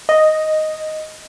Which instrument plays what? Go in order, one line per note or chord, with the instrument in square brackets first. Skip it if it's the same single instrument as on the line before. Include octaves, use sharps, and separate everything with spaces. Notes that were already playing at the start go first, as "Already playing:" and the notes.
[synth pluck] D#5